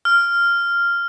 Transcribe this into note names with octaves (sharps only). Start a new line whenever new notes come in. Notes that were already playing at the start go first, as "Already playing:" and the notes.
F6